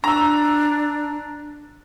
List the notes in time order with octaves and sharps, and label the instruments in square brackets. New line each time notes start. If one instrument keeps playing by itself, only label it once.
[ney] D4 [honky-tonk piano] A#5 E6